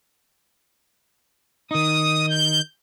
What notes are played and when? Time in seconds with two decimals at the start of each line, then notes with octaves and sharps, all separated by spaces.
1.71 D#3 D#4 D#6
2.30 G6